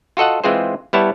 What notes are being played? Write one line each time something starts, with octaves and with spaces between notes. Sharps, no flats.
F4 F#4 A4 D#5 F#5
E3 G#3 C4 F4 G#4 C5
G3 B3 E4 C#5 A5